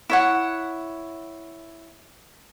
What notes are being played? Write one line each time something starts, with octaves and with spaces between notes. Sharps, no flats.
E4 C#5 F#5